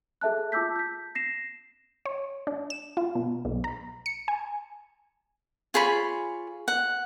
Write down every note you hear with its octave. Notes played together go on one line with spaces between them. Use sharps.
G#4 A4 E5 A5 F#6
F4 A5 D6 E6 G6 B6
G6 B6
A#6 C7 E7
C#5
D4
E7
F4
B2
B1
A#5
C#7
G#5
F4 G#4 C#5 B5
F#5